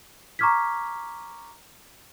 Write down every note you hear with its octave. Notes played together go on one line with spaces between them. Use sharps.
A#5 C#6 D6 F6 G#6 B6